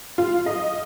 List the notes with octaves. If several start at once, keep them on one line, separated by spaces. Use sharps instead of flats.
F4
D#5